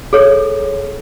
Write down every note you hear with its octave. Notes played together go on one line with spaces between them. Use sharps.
G#4 A4 C#5